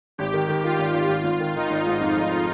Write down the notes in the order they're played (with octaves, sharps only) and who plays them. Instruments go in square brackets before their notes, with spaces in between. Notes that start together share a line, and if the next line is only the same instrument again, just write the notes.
[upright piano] G#1 [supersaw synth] G4
[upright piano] D#3
D#3
[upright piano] D#3 [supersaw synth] F4
[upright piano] G#1
G#1
[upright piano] G#1 [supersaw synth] F4
[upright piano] G#1
D#3
[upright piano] D#3 [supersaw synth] D#4
[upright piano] G#1
G#2
F2
F1